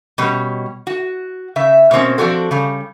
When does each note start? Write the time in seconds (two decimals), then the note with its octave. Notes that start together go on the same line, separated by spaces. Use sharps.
0.18 B2 G3 C#4
0.87 F#4
1.56 C#3 E5
1.91 B2 A#3 C4 C#4
2.18 F3 C4 D4 F#4 A4
2.51 C#3 G3